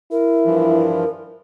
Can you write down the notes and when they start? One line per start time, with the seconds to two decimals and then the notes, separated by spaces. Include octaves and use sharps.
0.11 E4 A#4
0.44 G2 E3 F3